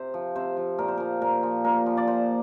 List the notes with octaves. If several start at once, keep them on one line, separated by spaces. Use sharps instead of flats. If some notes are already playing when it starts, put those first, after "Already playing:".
Already playing: C3 C5
F3
C3 C5
F3
A#2 A#4
C5
F3 A#4
A#2 A#4
F3
A#2 A#4
F3
D5
A#2 C5